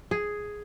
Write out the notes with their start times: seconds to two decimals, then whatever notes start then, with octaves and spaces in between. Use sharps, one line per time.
0.11 G#4